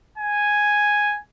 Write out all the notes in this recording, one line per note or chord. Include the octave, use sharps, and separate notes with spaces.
G#5